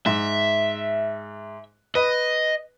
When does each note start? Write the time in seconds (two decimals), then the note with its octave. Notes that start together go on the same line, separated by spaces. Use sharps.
0.06 G#2 E5
1.95 B4 D#5